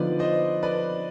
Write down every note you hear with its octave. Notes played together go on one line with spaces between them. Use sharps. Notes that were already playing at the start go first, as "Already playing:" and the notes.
Already playing: D3 F3 B3 D#4 B4 D5
C5 D#5
B4 D5